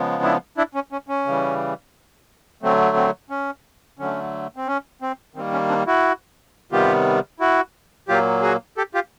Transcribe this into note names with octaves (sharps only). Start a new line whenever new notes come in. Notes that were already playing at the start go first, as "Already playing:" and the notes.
Already playing: C#3 F3 G#3 B3
D4 E4
D4 E4
C#4
C#4
C#4
C#3 E3 G3
D3 F#3 A3 C4
C4
C#4
D3 F#3 A3 C#4
C4
C#4
C4
D#3 G3 A#3 C4
C#4
C4 D4
E4 F#4
C3 D#3 G3 B3 F4 G4
E4 F#4
A#2 F#3 A#3 F4 G4
F#4 G#4
G4 A4
F4 G4